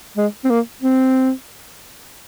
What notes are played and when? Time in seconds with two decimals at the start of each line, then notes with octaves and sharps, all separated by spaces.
0.17 G#3
0.44 C4
0.50 A#3
0.82 C4